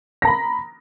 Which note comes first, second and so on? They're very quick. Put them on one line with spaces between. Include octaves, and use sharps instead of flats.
A#6 A#5 B5